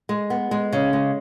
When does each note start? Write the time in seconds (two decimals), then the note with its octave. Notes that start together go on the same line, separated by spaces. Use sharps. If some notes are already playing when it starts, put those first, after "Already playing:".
0.09 G#3
0.30 B3
0.51 G#3
0.73 C#3
0.93 G#3